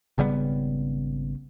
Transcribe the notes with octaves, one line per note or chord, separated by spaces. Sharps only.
G#1 C#3 G3 B3